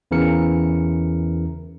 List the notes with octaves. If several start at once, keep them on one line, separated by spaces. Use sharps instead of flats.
E2 C#3 E3 A#4 C#7